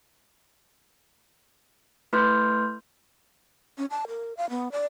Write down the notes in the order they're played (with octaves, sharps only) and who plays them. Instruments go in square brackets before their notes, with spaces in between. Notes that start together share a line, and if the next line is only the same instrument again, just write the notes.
[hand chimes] A3 E4 B4 C6 F6 G6
[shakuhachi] C#4
A5
A#4
F5
B3
D5